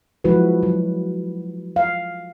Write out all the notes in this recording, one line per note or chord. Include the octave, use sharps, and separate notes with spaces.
F3 F#3 G#3 E4 F#4 B4
F#3
F5